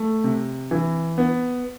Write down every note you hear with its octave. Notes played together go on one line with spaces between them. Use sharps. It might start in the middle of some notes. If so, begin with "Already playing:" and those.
Already playing: A3
C3
E3
B3